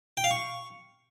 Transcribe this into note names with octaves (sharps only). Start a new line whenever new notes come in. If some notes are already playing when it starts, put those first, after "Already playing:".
G5
F5
C#6